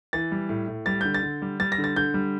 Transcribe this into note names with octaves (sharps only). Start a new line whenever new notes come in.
E3 A6
G3
A2
A2
G3 A6
D3 G6
A6
D3
G3
G3 A6
A#6
D3
A6
D3 G6
G3